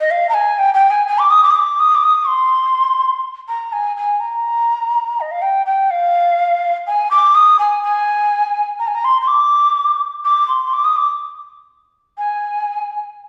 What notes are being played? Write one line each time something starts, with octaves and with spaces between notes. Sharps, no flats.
D#5
F5
A#5
G#5
G5
G5
G#5
G#5
D6
D#6
D6
D#6
D6
D#6
D6
D#6
C6
A#5
G#5
G#5
A#5
D#5
F5
G5
G5
F5
G#5
D6
D#6
G#5
G#5
A#5
G#5
A#5
C6
C6
D6
D6
C6
C6
D6
D#6
D6
G#5